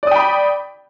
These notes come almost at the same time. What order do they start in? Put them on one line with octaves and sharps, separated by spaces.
D5 D#6 G5 B5